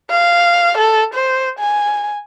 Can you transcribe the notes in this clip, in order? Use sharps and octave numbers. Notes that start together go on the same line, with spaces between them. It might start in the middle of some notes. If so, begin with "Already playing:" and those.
F5
A4
C5
G#5